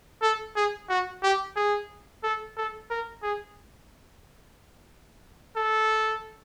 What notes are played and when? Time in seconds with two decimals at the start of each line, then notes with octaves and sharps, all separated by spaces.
0.22 A4
0.56 G#4
0.89 F#4
1.23 G4
1.56 G#4
2.23 A4
2.57 A4
2.90 A#4
3.23 G#4
5.57 A4